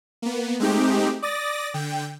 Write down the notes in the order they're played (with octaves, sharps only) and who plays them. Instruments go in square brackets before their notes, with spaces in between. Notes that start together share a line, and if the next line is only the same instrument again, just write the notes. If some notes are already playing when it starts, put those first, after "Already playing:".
[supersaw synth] A#3 B3
G#3 A3 C4 D#4 G4
D5 D#6 A6 A#6
D3 G5